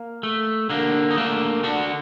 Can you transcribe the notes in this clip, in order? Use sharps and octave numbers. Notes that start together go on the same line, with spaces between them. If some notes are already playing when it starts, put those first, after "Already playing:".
Already playing: A#3
A3
D3 A#3 D4
D#4
A3 A#3 D4
D3 D4 F#4